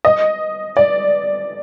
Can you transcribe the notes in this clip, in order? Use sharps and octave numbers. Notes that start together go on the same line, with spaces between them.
D#5
D5